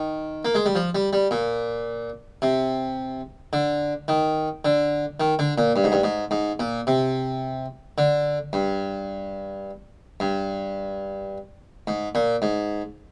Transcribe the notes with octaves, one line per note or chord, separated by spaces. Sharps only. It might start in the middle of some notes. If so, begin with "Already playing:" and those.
Already playing: D#3
A#3
G#3
G3
F3
G3
G3
A#2
C3
D3
D#3
D3
D#3
D3
A#2
G2
G#2
G2
G#2
G#2
A#2
C3
D3
G2
G2
G#2
A#2
G#2